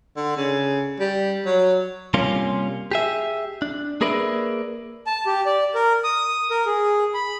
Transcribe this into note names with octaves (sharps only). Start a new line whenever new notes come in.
D3
C#3
G3
F#3
C3 G3 A#3 C#4 F4
G4 G#4 E5
D4
A#3 G#4 A#4 B4 D5 E5
A5
G4
D5
A#4
D#6
A#4
G#4
B5